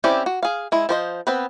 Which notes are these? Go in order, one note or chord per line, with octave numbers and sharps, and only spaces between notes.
C4 C#4 E4 G4 D5
F#4
G#4 F5
G#3 E4
F3 C5 D#5
B3 C4 B4